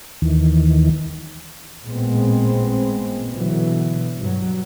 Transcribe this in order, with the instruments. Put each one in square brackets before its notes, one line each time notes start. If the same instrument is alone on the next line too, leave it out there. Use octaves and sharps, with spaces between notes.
[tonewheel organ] D#2 D#3 E3
[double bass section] A1 A#2 G#3 B3 C4
B2 D3 E3 F#3
G2 F#3